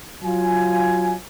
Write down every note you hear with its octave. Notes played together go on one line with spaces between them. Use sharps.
F#3 F4 G#5